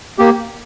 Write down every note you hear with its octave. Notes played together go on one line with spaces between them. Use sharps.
A#3 G4